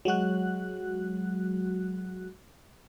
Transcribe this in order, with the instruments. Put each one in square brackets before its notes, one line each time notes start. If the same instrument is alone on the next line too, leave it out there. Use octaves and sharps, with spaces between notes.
[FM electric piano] F#3 G#3 F#4 F#6